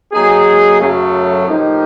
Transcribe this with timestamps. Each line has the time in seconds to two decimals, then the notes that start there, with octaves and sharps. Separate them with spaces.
0.12 F#3 A#3 D#4 G#4
0.79 F#2 C#3 F#3 A3
1.46 A2 F3 A#3 D#4 G4